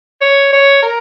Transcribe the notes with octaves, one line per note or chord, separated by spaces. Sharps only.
C#5
C#5
A#4